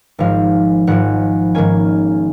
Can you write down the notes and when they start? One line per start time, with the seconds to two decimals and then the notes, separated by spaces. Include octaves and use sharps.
0.19 G#1 G#2 F3 G#3 F5
0.87 G#1 G#2 F3 G#3 F#5
1.54 G#2 D#3 A#3 C#4 G#5